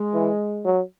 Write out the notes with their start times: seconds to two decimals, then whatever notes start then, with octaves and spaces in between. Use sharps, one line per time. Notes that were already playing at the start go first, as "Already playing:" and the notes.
Already playing: G#3
0.14 E3
0.65 F#3